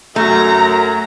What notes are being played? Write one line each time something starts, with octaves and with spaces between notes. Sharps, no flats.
F#2 A3 A#5